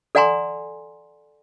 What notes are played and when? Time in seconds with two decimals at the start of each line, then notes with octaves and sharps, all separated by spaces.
0.15 A4 D5 F#5 G#5 A#5 C6